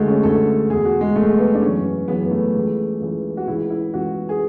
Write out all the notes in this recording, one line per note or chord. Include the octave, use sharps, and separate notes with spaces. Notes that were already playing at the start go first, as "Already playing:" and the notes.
Already playing: D2 D3 G#3 A3
C#4
D2 D3 A4
E2 B2 G#4
F#4
G#3
E2 B2 A3
B3
D4
F#2 C#3 E3 C#4
F#2 C#3 E3 B3
B3
A3
C#2 C#3 E3
C#2 C#3 E3
F#4
C#2 C#3 E3 E4
E4
C#2 C#3 E3 F#4
G#4